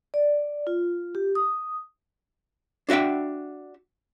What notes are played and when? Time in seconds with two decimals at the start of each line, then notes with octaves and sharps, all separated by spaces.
0.14 D5
0.67 F4
1.15 G4
1.35 D#6
2.89 D4 F#4 E5 F#5 G5